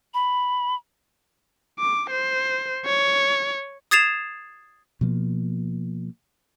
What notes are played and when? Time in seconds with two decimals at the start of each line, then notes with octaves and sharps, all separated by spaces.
0.14 B5
1.79 D6
2.11 C5
2.86 C#5
3.91 D#6 G#6 A6 C7 E7 F7
5.01 B2 F3 A#3